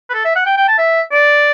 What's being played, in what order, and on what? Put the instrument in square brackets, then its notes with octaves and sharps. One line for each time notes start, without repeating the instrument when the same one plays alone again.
[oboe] B4
A4
E5
F#5
G5
G5
A5
E5
D5